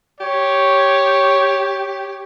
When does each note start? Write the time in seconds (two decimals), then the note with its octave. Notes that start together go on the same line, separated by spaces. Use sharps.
0.20 G4 C#5